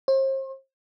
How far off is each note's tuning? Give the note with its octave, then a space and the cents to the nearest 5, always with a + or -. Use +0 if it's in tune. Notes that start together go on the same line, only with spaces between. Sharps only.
C5 +40